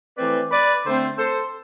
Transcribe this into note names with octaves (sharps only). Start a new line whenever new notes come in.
E3 A3 C4 B4 D5
B4 D5
D3 A3 C4 A4 C5
A4 C5